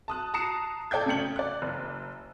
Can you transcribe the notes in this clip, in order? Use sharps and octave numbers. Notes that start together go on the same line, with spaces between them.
A5 D#6 F#6
A5 A#5 D#6 C7 C#7 E7
A4 D5 G5 G6 G#6
C#3 A3 G5 C#7 F#7
D5 F#6
F#1